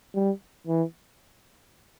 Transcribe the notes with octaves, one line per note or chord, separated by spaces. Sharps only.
G3
E3